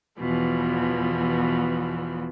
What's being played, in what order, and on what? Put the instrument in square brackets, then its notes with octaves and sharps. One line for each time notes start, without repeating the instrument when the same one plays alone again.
[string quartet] E2 B2 E3 F3